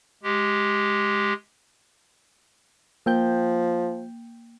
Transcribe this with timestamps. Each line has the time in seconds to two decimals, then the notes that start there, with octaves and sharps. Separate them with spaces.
0.23 G#3 G4
3.06 F3 A#3 G5 G6